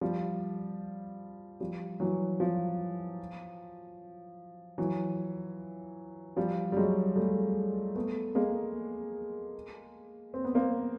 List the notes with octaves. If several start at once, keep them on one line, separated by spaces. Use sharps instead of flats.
F3 G3
F3 G3
E3 F#3
F3
E3 F#3
F3 G3
G3
F#3 G#3
G3 A3
A3 B3
G#3 A#3
C4
B3
A#3 C4